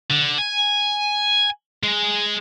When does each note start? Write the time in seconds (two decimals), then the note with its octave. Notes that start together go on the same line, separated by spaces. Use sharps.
0.11 D3
0.38 G#5
1.83 G#3